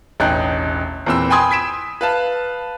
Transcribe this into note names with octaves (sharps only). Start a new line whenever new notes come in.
E1 A1 D#4 G5 F#6 G6
E2 A#2 C4 B5 E6
G5 G#5 B5 C6 D#6 G#6
G#6 B6 D7 E7
B4 F5 A5